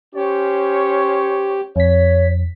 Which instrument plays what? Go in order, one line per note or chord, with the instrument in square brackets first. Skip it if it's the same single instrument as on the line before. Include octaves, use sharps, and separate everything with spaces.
[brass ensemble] C#4 C5 C#5 [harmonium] G4
[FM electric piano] F2 B6 [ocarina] C#5